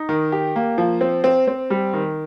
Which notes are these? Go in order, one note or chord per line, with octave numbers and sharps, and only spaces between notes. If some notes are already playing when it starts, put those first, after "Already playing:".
Already playing: D#4
D#3
G4
A#3
F3
C4
C4
C4
G3
D#3